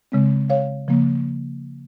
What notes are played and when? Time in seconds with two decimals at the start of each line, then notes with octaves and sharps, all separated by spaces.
0.12 C#3 G#3 C4
0.50 C#5 F5
0.88 C#3 F3 A#3